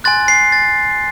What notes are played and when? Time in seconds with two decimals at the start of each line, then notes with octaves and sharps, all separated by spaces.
0.04 G#5 C6 F#6 A6
0.28 C7
0.52 A6